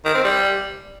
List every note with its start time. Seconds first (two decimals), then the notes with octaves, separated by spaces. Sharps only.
0.05 D#3
0.15 C4
0.24 G3